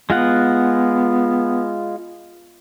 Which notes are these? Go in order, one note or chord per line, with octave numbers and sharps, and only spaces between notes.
G#3 B3 F4 F#5